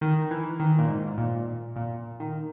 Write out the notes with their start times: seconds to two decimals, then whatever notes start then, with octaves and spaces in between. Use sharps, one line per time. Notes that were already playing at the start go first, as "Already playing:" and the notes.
0.01 D#3
0.31 E3
0.60 D#3
0.78 A#2
0.88 G#2
1.18 A#2
1.76 A#2
2.20 D#3